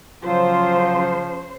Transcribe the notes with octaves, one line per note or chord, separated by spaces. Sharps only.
C#3 F3 F#3 F4 C5